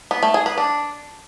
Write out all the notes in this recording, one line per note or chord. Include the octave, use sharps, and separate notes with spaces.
B3
A3
G#4
B4
D4